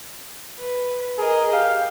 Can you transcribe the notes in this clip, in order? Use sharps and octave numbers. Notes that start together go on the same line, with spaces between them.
B4
G#4 A#4 D#5
G4 F5